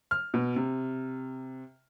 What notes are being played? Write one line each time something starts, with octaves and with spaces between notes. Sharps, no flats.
F6
B2
C3